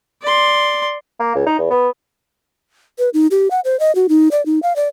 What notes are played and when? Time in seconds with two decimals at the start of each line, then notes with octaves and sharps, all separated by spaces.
0.22 D5 C6
1.20 A#3
1.35 C#2
1.46 D#4
1.59 E2
1.71 B3
2.99 B4
3.14 D#4
3.31 G4
3.51 F#5
3.65 C5
3.80 D#5
3.95 F#4
4.09 D#4
4.31 D5
4.46 D#4
4.63 F5
4.76 D5